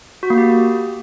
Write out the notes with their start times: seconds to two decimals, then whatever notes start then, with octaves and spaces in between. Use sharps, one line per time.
0.23 F#4
0.30 A#3
0.38 G4